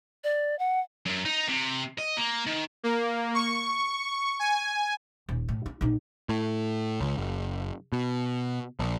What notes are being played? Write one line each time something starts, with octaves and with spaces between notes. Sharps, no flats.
D5
F#5
F#2
D#4
C3
D#5
A#3
D#3
A#3
C#6
G#5
D#1
A2
E4
A#1 D#4
A2
C#2
F#1
B2
A#1